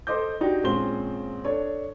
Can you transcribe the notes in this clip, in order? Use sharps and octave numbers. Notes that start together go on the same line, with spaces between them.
A4 C5 D#5 D6 G6
D4 D#4 F#4 G4
A#1 G#3 C4 C#4 C5 G7
D4 A4 C#5